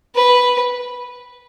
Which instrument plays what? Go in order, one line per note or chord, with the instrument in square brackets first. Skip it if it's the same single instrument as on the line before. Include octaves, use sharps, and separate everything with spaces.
[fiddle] B4